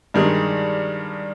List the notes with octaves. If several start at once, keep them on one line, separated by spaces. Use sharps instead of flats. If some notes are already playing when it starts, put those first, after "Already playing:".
G2 D#3 G#3